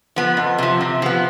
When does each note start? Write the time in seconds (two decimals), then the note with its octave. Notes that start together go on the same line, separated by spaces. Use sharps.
0.16 F3 B3
0.37 F2
0.58 C3 F3
0.81 C3
1.02 F3 B3